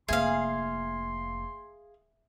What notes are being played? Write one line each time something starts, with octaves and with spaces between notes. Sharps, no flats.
F1 A#3 G#4 E5 F5 C6